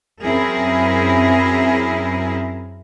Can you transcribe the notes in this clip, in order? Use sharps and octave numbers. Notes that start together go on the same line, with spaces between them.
F#2 C4 E4 G#4 A#4